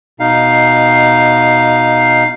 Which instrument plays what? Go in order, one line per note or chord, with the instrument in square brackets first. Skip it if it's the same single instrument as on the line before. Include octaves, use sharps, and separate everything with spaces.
[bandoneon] B2 D#4 F5